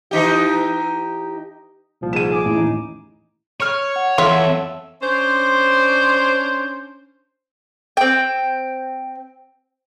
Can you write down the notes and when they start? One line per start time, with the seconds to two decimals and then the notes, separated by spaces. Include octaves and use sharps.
0.11 E3 D#4 G4
2.01 C2 A#2 F3
2.13 G#2 D#7 E7
2.31 G#4 D6
2.45 A1 E4
2.57 D#2 D#4
3.60 C#5 C#6 F6
3.96 F#5
4.18 E2 F4 A4 C#5 E5
5.02 C#4 D4 C5
7.97 C4 G5